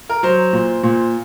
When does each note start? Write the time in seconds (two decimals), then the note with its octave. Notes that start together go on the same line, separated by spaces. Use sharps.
0.09 A#4
0.23 F#3 C5
0.53 A#2
0.83 A#2